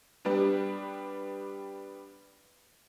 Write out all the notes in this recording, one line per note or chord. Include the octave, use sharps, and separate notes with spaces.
G3 B3 D4